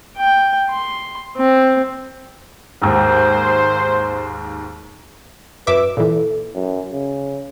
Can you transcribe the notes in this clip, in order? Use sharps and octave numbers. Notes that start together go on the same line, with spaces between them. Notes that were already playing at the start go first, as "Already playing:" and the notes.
G5
C6
C4
D#2 G#2 C5
F#2 B4 E5 D6
A#2 E3 A4
F#2
C#3